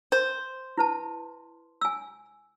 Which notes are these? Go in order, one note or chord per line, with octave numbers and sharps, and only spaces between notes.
C5
E4 B4 A5
G#5 E6